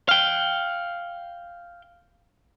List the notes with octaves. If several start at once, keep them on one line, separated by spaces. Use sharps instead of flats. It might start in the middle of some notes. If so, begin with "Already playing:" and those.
F5 G5